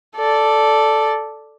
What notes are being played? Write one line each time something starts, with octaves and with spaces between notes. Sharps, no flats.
A4 D5